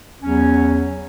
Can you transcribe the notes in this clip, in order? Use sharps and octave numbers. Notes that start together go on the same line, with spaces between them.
E2 F#3 C#4